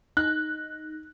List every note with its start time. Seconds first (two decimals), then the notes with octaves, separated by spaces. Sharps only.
0.17 D#4 F#6